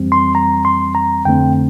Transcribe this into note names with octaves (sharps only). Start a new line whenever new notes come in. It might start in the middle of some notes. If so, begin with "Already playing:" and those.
Already playing: F2 E3 G3 C4
C6
A#5
C6
A#5
F2 D3 A3 C4 G5